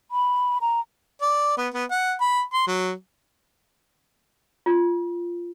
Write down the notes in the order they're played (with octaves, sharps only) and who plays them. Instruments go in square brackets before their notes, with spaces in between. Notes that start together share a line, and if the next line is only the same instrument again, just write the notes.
[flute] B5
A#5
[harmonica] D5
B3
B3
F#5
B5
C6
F#3
[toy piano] F4